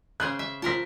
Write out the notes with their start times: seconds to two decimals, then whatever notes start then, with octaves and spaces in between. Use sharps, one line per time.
0.20 C#3 G#4 C5 F#6
0.39 E5
0.62 F3 F4 A#4 A5 B6